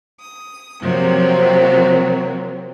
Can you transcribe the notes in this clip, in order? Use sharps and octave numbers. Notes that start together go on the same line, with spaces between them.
D#6
C3 F3 F#3 A#3 C4